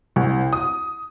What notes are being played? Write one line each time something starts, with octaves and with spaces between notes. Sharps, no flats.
C2
D#6